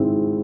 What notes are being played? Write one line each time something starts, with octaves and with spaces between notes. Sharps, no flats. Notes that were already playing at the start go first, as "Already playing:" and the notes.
Already playing: G#1 G#2 G#3 C4 E4